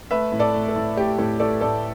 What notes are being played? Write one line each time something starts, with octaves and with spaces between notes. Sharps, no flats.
A3 B4 E5
A2
A4 D5
A3
A4
A2
A3 G4
A2 A4
A3 A4 D5
A2 A4 D5